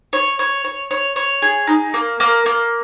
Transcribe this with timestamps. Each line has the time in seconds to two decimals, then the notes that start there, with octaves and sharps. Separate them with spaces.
0.13 C#5
0.39 C#5
0.65 C#5
0.91 C#5
1.16 C#5
1.42 G#4
1.67 D#4
1.94 A#3
2.20 A#3
2.46 A#3